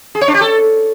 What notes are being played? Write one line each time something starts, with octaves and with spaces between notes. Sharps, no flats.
G#4
C#5
D4
G4
A4